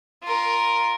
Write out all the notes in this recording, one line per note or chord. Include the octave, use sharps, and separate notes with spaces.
F4 A#4